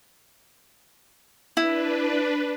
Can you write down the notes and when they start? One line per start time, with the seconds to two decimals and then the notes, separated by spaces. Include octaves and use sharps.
1.57 D4 E4 B4